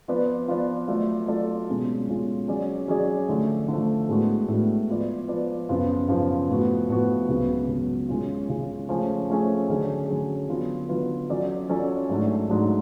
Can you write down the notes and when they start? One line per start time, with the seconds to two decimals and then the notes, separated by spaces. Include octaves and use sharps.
0.08 F3 B3 F4 B4 D5
0.48 F3 B3 F4 B4 D5
0.88 F#3 A3 F4 A4 D5
1.28 F#3 A3 F4 A4 D5
1.68 B2 G#3 C#4 F4
2.08 B2 G#3 C#4 F4
2.48 F#3 C#4 G#4 D5
2.88 F#3 C#4 G#4 D5
3.28 D3 F3 A3
3.68 D3 F3 A3
4.09 A2 G#3 B3 D4 F#4
4.48 A2 G#3 B3 D4 F#4
4.89 F3 B3 F4 B4 D5
5.28 F3 B3 F4 B4 D5
5.69 F#2 C#3 F3 B3 F4
6.08 F#2 C#3 F3 B3 F4
6.48 A2 F3 B3 F#4
6.89 A2 F3 B3 F#4
7.28 C#2 C#3 F#3 B3
7.68 C#2 C#3 F#3 B3
8.09 C#3 G#3 C#4 F4
8.49 C#3 G#3 C#4 F4
8.89 F3 A3 C#4 G#4
9.29 F3 A3 C#4 G#4
9.69 D3 F#3 C#4 G#4
10.08 D3 F#3 C#4 G#4
10.49 D3 F#3 B3 F4 B4
10.89 D3 F#3 B3 F4 B4
11.29 F#3 C#4 F4 A4 D5
11.69 F#3 C#4 F4 A4 D5
12.09 G#2 F#3 A3 D4
12.49 G#2 F#3 A3 D4